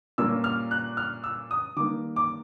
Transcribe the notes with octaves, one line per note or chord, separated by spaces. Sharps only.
A#2 G3 A#3 C#4 E6
F6
F#6
F6
E6
D#6
D#3 G3 A#3 D6
D6